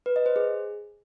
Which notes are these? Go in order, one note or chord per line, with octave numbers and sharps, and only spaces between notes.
B4
D#5
C5
G#4